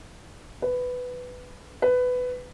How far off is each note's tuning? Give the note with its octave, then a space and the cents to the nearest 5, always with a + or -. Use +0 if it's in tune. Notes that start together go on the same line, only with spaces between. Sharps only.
B4 +10
B4 +15